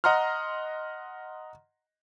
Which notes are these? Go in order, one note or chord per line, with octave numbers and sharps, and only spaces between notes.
D#5 F#5 A#5 C6 F6